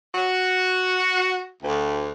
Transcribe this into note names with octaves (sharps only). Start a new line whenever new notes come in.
F#4
D2